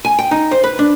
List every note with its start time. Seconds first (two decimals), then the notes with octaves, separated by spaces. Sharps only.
0.05 G#5
0.19 G5
0.31 D#4
0.51 C5
0.64 B4
0.79 D4